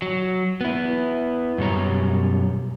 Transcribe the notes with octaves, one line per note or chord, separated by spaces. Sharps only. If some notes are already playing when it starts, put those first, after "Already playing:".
F#3
B3 E4
F#2 B2 G3 C#5 A#5